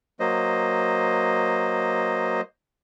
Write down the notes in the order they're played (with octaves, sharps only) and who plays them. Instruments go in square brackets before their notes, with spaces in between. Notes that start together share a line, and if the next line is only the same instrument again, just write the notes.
[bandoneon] F#3 A#3 C5 D#5